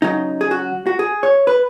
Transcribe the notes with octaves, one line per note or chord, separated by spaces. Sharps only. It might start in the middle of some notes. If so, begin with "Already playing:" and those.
C#3 F#3 D#4
G#4
F#4
F#4
G#4
C#5
B4